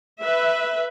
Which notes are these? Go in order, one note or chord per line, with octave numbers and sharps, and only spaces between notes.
B4 E5